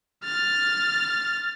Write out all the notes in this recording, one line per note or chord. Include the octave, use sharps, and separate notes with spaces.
F6 A6